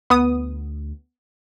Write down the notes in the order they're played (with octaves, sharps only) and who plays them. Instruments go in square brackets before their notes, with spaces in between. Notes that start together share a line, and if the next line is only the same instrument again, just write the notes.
[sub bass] D2 [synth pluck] B3 D#6